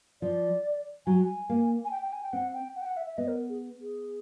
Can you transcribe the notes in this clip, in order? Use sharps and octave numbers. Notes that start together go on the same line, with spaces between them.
F3 D5
F#3 G#5
G#5
A#3
G#5
G5
G5
G#5
G5
C4 F#5
G5
F#5
G5
F#5
E5
E5
B3 D#5
A#4
G#4
G#4